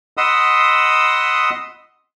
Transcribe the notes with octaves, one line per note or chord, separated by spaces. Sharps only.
D#5 F#5 B5 C6 D#6 E6